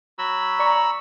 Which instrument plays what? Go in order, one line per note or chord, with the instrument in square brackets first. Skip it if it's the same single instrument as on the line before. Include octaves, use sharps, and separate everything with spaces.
[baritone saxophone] F#3 [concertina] B5 E6
[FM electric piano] D5 C#6 [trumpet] A#5